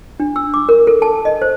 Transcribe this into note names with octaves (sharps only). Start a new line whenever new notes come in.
D4
E6
D6
A#4
A4
A5
D#5
C5